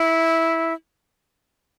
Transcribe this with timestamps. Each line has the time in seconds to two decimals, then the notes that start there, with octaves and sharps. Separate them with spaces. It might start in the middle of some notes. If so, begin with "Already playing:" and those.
Already playing: E4